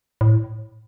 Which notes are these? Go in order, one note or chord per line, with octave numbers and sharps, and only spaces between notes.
A2